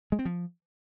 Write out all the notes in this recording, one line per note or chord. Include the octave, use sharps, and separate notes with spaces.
G#3
C4
F3